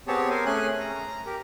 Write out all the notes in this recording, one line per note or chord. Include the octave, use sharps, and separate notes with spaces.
B3 C4 G4 G#4 C#5 A5
A#4 C5 G#5
A3 C#4 G#4 G#5 F#6
A#5
G4 A#4